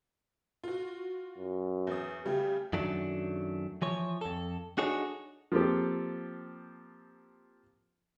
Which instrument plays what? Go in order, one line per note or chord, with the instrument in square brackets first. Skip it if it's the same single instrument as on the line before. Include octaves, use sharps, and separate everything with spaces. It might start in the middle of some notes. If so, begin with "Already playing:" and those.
[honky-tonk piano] F4 F#4
[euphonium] F#2
[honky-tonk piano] E2 D#6
[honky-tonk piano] C#3 G3 A3 [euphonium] G4
[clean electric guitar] F#2 D#3 F#3 A3 D4
E3 F3 C#5
F2 A4
D4 D#4 F#4 G#4 A4 C#5
[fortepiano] F3 A#3 C4 G4 A4